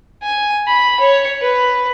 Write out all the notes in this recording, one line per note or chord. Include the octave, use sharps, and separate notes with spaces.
G#5
B5
C#5
B4